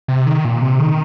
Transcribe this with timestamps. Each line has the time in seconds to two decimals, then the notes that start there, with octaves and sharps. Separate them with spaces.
0.08 C3
0.27 D#3
0.45 A#2
0.62 C3
0.80 D#3